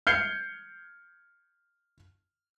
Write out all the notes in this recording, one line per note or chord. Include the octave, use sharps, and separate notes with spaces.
F6 G6 G#6 C7 C#7 G7